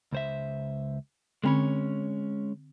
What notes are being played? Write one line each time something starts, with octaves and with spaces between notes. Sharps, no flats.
C#2 C5 E5
D3 G#3 C4 C#4 C#5 B5